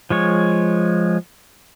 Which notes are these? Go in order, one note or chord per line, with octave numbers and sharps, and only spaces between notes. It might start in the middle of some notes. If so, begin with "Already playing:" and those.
F3 G#3 C#5